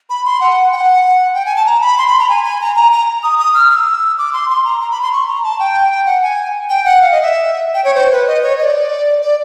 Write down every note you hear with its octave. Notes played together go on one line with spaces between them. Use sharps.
B5
C6
F#5
G5
F#5
G5
G#5
A5
A#5
B5
C6
B5
A#5
G#5
G#5
A#5
A#5
A#5
D#6
D#6
F6
F6
E6
D6
C6
C6
A#5
A#5
B5
C6
C#6
A#5
A5
G5
F#5
G#5
G5
F#5
F5
D#5
E5
G5
C#5
C5
B4
D#5
C#5
D#5
D5
D5